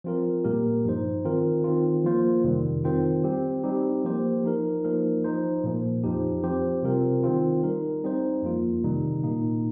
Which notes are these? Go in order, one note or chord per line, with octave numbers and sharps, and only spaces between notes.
F3 C4 F4 A#4
A#2 G3 A#3 G4 A#4
G2 F3 D#4 C5
D#3 C4 F4 A#4
D#3 C4 F4
F3 A#3 F4 C5
F2 C3 D#3 G3
D#3 C4 F4 C5
G3 C4 G4
G3 C4 D#4 G4
F3 A#3 G4 C5
F3 D#4 A#4
F3 A#3 D#4 A#4
F3 D#4 C5
A#2 F3 A#3
F2 F3 D#4 G4
F3 C4 G4 C5
C3 G3 C4 F4 A#4
D#3 C4 F4
G3 D#4 A#4
G3 C4 D#4 C5
F2 F3 A#3 F4
C3 D#3 G3 D#4
A#2 A#3 D#4